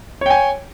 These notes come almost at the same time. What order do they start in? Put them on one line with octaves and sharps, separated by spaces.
C#5 G5 G#5